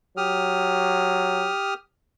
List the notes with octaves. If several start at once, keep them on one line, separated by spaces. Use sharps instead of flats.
F#3 G4 D#6 F6